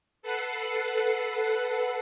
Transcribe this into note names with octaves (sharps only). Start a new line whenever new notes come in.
A4 B4 F#5 C7